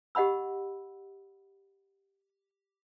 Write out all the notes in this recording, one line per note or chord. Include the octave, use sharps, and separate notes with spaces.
G4 D#5 F#5 B5 E6